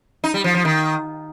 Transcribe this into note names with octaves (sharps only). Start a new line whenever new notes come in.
D#4
G3
F3
F3
D#3